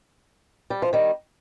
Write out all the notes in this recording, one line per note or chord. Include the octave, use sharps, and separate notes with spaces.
G3
F3
D#3 G3